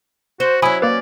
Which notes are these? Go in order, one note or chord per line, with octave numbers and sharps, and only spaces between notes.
F#4 C5
F#3 C#4 E4 G#5 B5 D#6
A#3 B4 D5